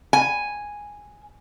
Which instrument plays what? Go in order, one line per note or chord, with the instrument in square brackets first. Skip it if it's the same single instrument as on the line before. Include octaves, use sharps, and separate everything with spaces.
[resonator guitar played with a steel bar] G#5